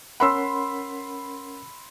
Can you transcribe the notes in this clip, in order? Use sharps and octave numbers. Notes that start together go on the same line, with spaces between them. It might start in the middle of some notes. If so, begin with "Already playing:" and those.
C#4 A#4 F#5 B5 C6 E6